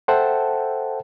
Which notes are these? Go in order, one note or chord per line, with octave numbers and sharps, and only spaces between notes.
A4 C5 E5 F#5 G5 A5